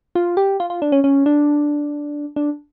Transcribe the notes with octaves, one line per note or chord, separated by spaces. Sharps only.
F4
G4
F4
F4
D4
C#4
C#4
D4
D4